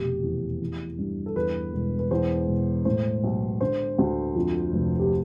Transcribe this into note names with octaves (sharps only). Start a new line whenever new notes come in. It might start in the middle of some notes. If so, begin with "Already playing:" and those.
Already playing: F1 B2 G4
E2
E3
G2
A4
E2 B4
E1
B4
E2 C5
E1
A2 C5
B1
D3 C5
D2
F2
F1
G4